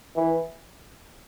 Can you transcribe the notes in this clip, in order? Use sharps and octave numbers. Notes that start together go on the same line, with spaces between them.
E3